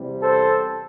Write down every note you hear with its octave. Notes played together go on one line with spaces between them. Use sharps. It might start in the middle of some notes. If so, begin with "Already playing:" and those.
Already playing: E2 C3 G3
A4 C5